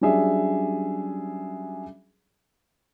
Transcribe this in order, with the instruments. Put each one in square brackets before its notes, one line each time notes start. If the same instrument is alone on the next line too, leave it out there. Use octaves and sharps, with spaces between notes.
[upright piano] F#3 G3 C#4 D4 G#4 E5